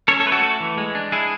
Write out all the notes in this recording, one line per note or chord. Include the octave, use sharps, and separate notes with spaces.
C#4 A4 C#5
A4 C#5
A3 B4
F#4 A4
A3
E3
G#3
D4
G#3 E4 G#4